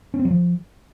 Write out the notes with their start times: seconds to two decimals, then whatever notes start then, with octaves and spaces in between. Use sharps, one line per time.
0.14 C#4
0.19 C4
0.25 F#3
0.30 F3